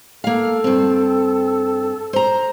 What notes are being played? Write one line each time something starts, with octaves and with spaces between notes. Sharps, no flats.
A#3 A4 F5
G2 C4
C5 A#5